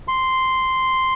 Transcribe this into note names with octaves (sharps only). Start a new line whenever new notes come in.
C6